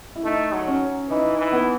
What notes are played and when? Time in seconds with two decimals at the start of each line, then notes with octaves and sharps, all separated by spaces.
0.16 E4
0.24 A3 D#4
0.53 F#3
0.67 C#4
1.09 E3 D#4
1.38 E3
1.52 B3